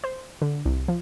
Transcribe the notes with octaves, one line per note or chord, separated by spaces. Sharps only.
C5
D3
C2
F3